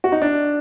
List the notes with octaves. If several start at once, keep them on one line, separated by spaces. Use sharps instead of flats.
F#4
D#4
D4